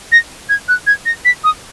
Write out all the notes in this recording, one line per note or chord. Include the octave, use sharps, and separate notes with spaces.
A#6
G#6
F#6
G#6
A#6
B6
D#6